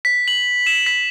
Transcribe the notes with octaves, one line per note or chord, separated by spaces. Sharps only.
B6
F#7
E7
B6